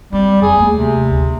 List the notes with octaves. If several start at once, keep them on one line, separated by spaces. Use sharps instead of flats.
G3 C4
F2 G#4
D#2 A3
C3
D2